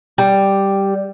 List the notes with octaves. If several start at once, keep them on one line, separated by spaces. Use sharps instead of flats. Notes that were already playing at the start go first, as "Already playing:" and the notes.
G3